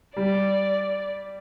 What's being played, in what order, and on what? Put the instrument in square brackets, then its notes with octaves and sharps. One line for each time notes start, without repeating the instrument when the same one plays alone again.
[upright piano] G3 [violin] D5